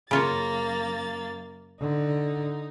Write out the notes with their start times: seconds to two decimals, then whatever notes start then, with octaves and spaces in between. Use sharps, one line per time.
0.11 F#2 C#3 A#3 F4 C#5 A6
1.81 D3 D#4